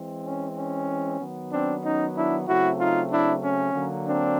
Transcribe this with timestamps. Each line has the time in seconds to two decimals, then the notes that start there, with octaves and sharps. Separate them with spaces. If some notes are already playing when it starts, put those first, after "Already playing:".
Already playing: E3 G#3 C4
0.24 C#4
0.56 C#4
1.20 D#3 F#3 B3
1.51 C4 D4
1.83 C#4 D#4
2.15 D4 E4
2.47 C#3 F#3 A3 C4 E4 F#4
2.78 D#4 F4
3.10 D4 E4
3.42 C#4
3.73 D3 F#3 A#3
4.05 C4 D4